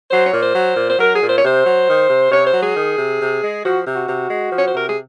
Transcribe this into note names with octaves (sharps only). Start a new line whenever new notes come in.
F#3 C5
C#5
A#2
C5
F#3
A#2
C5
F#3 A#4
G#4
A#2
C5
C#5
C3 C5
F#3
D#3
C3
C3 C#5
C5
F#3
G#4
D#3
C3
C3
G#3
F3 F#4
C3
F#4
C3
G#3
F3
C#5
C5
C3 A#4
G#4